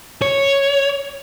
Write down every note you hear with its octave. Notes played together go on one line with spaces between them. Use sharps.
C#5